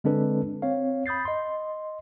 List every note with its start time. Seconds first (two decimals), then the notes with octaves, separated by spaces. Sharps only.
0.04 D3 G#3 C4 D4 A4 B4
0.62 C4 C#5 F5
1.06 B5 D#6 G6 A6 C7
1.25 D#5 C6